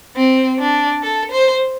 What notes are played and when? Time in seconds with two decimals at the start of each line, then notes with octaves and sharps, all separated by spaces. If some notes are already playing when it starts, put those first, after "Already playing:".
0.17 C4
0.59 D4
1.03 A4
1.31 C5